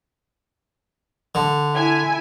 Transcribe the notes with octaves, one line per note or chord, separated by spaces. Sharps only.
D3
E4 E5 G#5